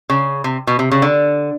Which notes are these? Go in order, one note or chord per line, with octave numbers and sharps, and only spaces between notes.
C#3
C3
B2
C3
C#3
D3